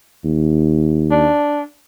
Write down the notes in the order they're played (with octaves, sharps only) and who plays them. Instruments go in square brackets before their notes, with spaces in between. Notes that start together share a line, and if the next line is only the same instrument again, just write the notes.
[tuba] D#2
[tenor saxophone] D4